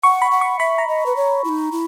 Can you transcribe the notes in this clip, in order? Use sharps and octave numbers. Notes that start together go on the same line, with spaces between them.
F#5 C#6
B5
F#5
C#6
E5 B5
A#5
D#5
B4
C#5
E4
D#4
E4